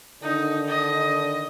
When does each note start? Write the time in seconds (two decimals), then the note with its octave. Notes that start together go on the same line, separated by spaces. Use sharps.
0.22 D3 D#3 D4 D#4
0.67 D#5